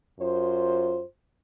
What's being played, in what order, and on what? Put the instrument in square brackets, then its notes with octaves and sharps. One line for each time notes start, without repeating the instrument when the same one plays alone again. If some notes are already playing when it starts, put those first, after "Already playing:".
[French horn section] F#2 F4 C5